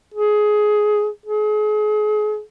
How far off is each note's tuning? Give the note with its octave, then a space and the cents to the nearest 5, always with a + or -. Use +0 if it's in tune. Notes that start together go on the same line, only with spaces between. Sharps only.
G#4 +15
G#4 +35